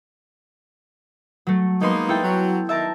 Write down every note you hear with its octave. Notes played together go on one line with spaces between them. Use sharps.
F#3 A3
G#3 A#3 B3 D#4 C6
E4 A4 G5
F#3
D#3 E5 A5 A#5